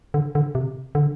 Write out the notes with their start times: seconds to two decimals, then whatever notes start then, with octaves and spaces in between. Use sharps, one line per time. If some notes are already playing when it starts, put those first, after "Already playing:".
0.14 D3
0.35 D3
0.55 C3
0.95 D3